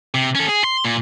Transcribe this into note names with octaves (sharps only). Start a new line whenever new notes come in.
C3
C#4 A4
G#4
C6
A#2